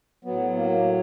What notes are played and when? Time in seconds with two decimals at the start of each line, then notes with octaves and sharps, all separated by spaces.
0.25 A2 F#3 B3
0.56 A#3